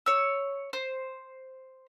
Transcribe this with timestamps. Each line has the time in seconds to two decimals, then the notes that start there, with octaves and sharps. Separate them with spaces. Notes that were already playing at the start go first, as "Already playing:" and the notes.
0.06 C#5 E6
0.73 C5